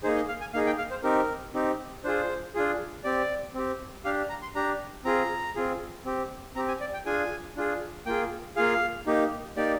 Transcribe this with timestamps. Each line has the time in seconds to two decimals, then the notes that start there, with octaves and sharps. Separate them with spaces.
0.03 A#3 D#4 G#4 C5
0.16 D#5
0.28 F5
0.41 G#5
0.54 A#3 D#4 G#4 F5
0.66 G5
0.78 F5
0.91 C5
1.03 C4 D#4 G4 A#4
1.54 C4 D#4 G4
2.04 D4 F4 G#4 C5
2.54 D4 F4 G#4
3.04 C4 G4 D5
3.54 C4 G4
4.05 D4 G4 F5
4.29 A#5
4.42 C6
4.55 D4 G4 A#5
5.04 C4 F4 G#4 A#5
5.55 C4 F4 G#4
6.05 C4 G4
6.56 C4 G4 A#5
6.68 G#5
6.81 D5
6.93 G5
7.05 D4 F4 G#4 G#5
7.56 D4 F4 G#4
8.06 A#3 F4 G#4 G5
8.56 A#3 F4 G#4 F5
9.07 A#3 D#4 G4
9.57 A#3 D#4 G4 D5